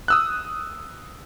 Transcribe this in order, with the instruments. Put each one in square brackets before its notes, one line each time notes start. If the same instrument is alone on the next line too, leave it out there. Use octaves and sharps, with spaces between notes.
[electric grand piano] D#6 E6 F#6